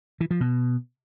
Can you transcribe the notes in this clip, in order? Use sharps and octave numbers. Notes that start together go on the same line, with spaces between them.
E3
F3
B2